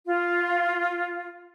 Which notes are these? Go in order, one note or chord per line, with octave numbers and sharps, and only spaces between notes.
F4